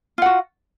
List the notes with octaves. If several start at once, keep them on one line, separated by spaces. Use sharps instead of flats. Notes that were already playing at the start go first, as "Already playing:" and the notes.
F4 F#4 F#5